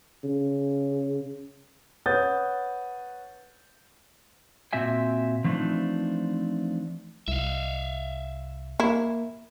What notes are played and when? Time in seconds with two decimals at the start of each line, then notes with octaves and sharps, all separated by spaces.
0.24 C#3
2.06 B4 C#5 F#5 D#6 G6 A6
4.73 A#2 C4 F#4 E5 G#5
5.44 E3 F3 A3 C4 D4 D#4
7.28 C2 E5 F5
8.80 A#3 E4